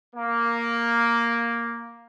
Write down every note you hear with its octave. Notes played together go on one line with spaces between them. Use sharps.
A#3